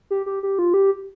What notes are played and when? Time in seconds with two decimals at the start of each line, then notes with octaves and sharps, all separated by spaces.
0.11 G4
0.26 G4
0.43 G4
0.59 F4
0.74 G4